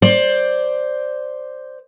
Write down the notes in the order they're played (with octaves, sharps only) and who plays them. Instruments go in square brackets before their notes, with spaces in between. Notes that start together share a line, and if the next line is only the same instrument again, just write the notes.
[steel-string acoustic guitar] C5 D5